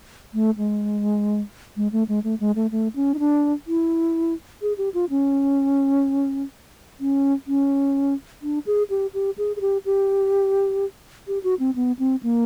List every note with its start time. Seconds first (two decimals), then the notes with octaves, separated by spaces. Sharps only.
0.34 A3
0.58 G#3
1.77 G#3
1.92 A3
2.08 G#3
2.24 A3
2.40 G#3
2.56 A3
2.71 A3
2.96 C#4
3.14 D#4
3.19 D4
3.67 E4
4.62 G#4
4.78 G4
4.94 F4
5.10 C#4
7.00 C#4
7.47 C#4
8.42 D4
8.66 G#4
8.90 G4
9.14 G4
9.38 G#4
9.56 G#4
9.61 G4
9.85 G4
11.27 G4
11.43 F#4
11.59 C4
11.75 B3
11.99 C4
12.23 A#3